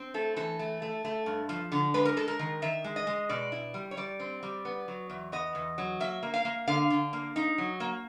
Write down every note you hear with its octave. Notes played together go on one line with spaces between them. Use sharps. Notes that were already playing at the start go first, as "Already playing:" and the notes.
Already playing: C4
A3 A4
E3 A4
A3
A3
A3
G2
F3
D3
G#3 B4
A#4
G#3 A4
A#4
D#3
D#3 E5
G#3
D#5
G#3
B2 D5
E4
G3
C#5
G3 D5
C4
G3
B3
F#3
E2
B3 D#5
E2
F#3
A#3 E5
A#3
F5
A#3
D3 F5
D3
A#3
D#4
F#3
A#3